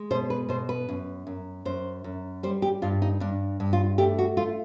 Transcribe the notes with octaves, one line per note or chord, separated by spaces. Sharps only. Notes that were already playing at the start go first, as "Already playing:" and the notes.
Already playing: G#3
B2 C5
B4
B2 C5
B4
F#2
F#2
F#2 C5
F#2
G3 C5
G4
G2 F4
D#4
G2 D4
G2
F4
A3 G4
F#4
A3 F4